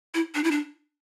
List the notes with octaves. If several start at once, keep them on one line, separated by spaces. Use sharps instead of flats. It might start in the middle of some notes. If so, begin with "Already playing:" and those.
E4
D4
E4
D4